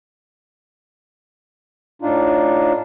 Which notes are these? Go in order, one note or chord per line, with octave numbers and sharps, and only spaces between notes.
A2 D4 D#4 F4